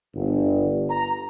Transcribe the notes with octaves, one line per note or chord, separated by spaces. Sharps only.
G1
A#5